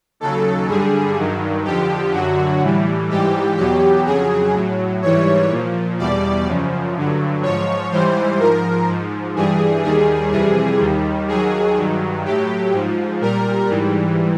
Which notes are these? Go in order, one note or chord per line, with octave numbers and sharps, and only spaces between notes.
D#2 C#3 F#3 A4
G2 D3 G3 G#4
G2 D#3 F#3
F2 D3 F3 G4
F#2 D3 F#3 F#4
A2 E3 G3
G#2 E3 G3 G4
E2 B2 F#3 G4
F2 C#3 F#3 G#4
A2 F#3
G#2 E3 G3 C#5
A#2 F3
E2 B2 G3 D5
F#2 C#3 F3
G2 D3 F#3
G#2 F3 C#5
G#2 E3 G3 C5
G#2 F3 A#4
G#2 F3
G2 E3 G3 G#4
D#2 D#3 G3 G#4
F2 C3 E3 G3 G#4
D#2 D#3 G3
D#2 D#3 F#3 G#4
G2 D#3 F#3
A2 F#3 G4
G#2 F3
A#2 G3 A#4
G#2 E3 G3